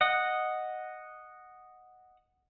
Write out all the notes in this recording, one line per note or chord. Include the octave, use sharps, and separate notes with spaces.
D#5 F#5